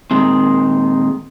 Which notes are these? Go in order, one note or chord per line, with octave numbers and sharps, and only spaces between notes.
A#2 D#3 G#3 C4